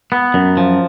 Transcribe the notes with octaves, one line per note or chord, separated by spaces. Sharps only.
B3
F#2
F3